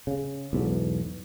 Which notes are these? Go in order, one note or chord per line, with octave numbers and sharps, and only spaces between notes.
C#3
B1 E2 G#2